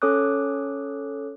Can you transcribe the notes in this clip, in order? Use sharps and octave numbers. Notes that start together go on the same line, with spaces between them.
C#4 A4 C#5 D6 D#6 F#6